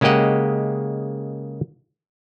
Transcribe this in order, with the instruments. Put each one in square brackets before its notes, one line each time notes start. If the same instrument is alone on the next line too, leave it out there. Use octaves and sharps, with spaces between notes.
[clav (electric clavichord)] C#3 G#3 A#3 G4 D#5 F#5